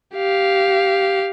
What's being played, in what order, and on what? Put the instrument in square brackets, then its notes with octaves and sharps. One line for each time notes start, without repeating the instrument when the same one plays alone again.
[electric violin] G4 F5